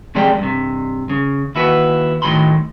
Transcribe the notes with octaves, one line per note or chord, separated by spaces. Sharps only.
C3 F3 G#3 G4 D5 G5
G2 C3
C#3
D#2 E4 F#4 B4
A2 D#3 E3 F#3 B5 C6